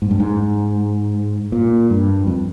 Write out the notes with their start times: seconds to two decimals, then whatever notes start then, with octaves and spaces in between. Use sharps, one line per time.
0.02 G#2
0.11 G2
0.20 G#2
1.52 A#2
1.90 G2
2.27 F2